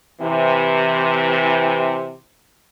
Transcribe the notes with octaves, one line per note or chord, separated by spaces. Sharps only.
C3 E3